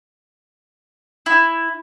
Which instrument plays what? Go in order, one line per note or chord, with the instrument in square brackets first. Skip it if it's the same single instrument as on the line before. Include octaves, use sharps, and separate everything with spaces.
[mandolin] E4